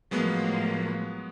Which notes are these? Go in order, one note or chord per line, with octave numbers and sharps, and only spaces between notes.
A2 F3 F#3 G#3 A#3 B3